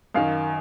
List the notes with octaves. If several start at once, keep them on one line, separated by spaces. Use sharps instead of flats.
F#2 D#3 F5